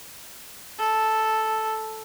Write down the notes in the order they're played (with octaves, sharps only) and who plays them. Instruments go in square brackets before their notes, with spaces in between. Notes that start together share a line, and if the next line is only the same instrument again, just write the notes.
[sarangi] A4